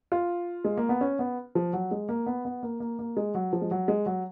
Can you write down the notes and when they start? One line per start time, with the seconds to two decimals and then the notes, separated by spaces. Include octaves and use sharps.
0.12 F4
0.64 G#3
0.77 A#3
0.89 B3
1.01 C#4
1.19 B3
1.55 F3
1.73 F#3
1.91 G#3
2.09 A#3
2.26 B3
2.45 B3
2.63 A#3
2.80 A#3
2.99 A#3
3.17 G#3
3.35 F#3
3.53 F3
3.61 G#3
3.71 F#3
3.88 G#3
4.06 F#3